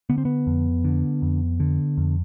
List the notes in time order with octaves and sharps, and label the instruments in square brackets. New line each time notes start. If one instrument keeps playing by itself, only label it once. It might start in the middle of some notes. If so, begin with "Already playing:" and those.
[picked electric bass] D3 B3
C4
B3
F2
D3
F2
D3
F2